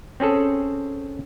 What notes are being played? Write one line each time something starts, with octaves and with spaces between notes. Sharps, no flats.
C4 C#4 G#4 A4